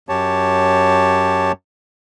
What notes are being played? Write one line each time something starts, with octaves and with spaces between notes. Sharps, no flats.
F#2 G4 C#5 A5